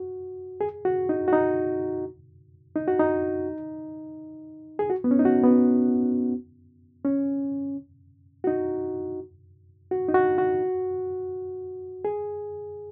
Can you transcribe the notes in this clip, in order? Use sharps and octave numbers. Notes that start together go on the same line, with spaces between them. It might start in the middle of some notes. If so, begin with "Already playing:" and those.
Already playing: F#4
G#4
F#4
D#4
F#4
D#4
D#4
F#4
D#4
G#4
F#4
B3
C#4
D#4
F#4
B3
C#4
F#4
D#4
F#4
D#4
F#4
F#4
G#4